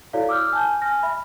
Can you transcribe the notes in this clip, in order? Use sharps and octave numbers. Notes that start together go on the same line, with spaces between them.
E4 F#4 A4 C#5 D5 F5
D6 E6 F6 G6
G#5 A5 G6
G#5 F6 A#6
E5 B5